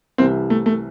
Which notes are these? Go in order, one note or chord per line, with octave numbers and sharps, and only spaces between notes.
C2 C3 E3 C4
A3
A3